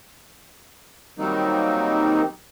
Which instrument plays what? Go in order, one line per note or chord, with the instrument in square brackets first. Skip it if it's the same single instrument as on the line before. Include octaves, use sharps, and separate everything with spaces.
[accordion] D#3 F#3 G3 A#3 C4 D#4